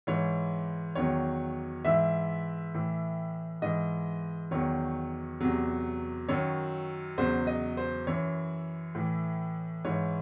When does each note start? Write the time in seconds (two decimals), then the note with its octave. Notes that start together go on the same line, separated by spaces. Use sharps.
0.07 G#2 E3 C#5
0.95 E2 D#3 F#3 C#5
1.85 G#2 E3 E5
2.74 A2 E3
3.62 G#2 E3 D#5
4.51 E2 D#3 F#3 C#5
5.41 E2 C3 F#3
6.29 F#2 D#3 F#3 C#5
7.18 E2 C#3 F#3 C5
7.47 D#5
7.77 C5
8.07 F#2 E3 C#5
8.95 A2 E3
9.85 G#2 E3 C#5